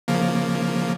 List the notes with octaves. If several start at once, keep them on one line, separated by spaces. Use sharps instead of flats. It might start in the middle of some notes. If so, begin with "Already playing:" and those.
C#3 F3 A#3